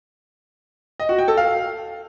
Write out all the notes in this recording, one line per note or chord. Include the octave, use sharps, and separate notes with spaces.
D#5
F#4
G5
A4
F5